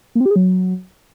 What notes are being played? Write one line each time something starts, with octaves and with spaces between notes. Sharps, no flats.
A#3
C4
G4
G#4
F#3